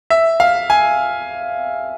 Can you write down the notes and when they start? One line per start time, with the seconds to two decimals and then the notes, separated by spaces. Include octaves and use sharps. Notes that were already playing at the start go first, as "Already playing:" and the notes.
0.10 E5
0.40 F5
0.70 G#5